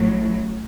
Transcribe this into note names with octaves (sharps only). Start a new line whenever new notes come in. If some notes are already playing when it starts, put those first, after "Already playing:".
Already playing: A1 A2 F#3